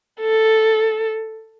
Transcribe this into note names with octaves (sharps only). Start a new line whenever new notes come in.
A4